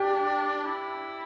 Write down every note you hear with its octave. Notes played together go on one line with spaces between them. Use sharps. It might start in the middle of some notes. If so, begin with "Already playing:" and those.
Already playing: D4 G4
E4